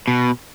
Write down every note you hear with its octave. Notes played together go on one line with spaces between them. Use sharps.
B2